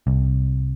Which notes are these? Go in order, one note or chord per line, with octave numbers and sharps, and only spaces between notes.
C2